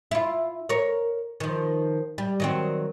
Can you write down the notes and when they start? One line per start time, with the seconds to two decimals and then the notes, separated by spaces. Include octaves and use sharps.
0.11 E4 F4
0.69 A#4 C#5
1.40 D#3 F3
2.18 G3
2.40 D#3 F#3 C4